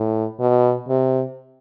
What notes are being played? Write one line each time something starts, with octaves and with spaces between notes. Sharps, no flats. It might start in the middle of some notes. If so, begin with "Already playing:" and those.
Already playing: A2
B2
C3